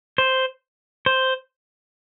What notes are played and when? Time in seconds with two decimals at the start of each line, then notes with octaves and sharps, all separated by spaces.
0.18 C5
1.06 C5